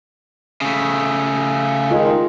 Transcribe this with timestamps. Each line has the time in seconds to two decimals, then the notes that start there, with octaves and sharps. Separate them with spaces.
0.61 C#3 A3
1.91 D#3 G#3 D#4 F4 D#5